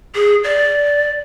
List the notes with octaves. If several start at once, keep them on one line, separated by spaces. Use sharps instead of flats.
G#4
D5